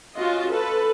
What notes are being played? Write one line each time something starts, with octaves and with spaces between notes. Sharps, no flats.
C#4 F4 F#4 D#5
A4 B4